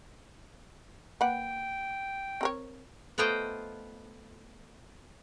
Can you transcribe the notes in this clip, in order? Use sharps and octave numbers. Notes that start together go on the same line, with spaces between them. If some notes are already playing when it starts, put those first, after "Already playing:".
A#3 B4 F#5 G5
C4 A#4 C#5
A3 B3 F4 C5 D#5 G5